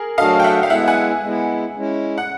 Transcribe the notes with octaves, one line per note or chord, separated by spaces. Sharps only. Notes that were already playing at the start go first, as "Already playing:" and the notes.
Already playing: G#4 A#4
F#3 A3 D4 F#4 A4 D#5 F5
G5
E5 F#5
F5
G#3 B3 E4 E5 F#5
F#5 G#5
G#3 B3 E4
G#3 C#4 E4
F#5